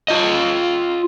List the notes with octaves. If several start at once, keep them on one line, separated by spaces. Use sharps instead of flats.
F4 D#5